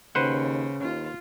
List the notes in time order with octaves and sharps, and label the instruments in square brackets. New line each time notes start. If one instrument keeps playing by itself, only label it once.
[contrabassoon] D#2 [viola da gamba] C#3 [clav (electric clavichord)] B4 C5 F#5
[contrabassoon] D#2 [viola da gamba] F4